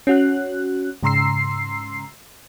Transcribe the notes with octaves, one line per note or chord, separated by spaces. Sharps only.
C#4 F#4 F#6
G#2 C#3 A#5 C6 E6 C7